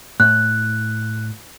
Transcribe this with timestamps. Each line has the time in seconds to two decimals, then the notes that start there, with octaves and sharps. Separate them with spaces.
0.20 A2 F#6